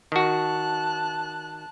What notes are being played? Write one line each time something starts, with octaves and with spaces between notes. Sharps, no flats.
D#3 F#4 A5 F#6